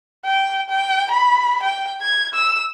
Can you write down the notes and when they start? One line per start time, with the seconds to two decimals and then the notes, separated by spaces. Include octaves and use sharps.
0.25 G5
0.69 G5
1.11 B5
1.63 G5
2.01 G#6
2.34 E6